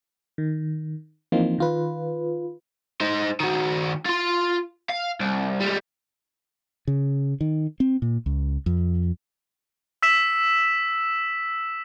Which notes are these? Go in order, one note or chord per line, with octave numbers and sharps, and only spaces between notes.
D#3
E3 F3 A#3 C4 D#4 F4
D#3 F4 B4
D#4 C5
D#3 F#4
F4 C6
F5
C2
G3 G#3
C#3
D#3
C4
A#2
C#2
F2
E6 B6 E7